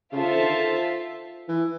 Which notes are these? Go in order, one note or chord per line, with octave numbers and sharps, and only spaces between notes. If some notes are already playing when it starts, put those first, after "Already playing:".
C#3 F4 A4 C5 E5 A5
D3
D#3
E3